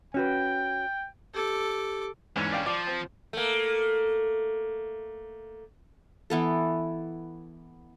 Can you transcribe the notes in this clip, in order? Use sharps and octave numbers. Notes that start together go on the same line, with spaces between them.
C#4 F#4 B4 G5
G4 A4 D6
E2 G#2 D3 C#4
D5 F5 G5
F3 D5
C4
A3 A#3
E3 B3 A4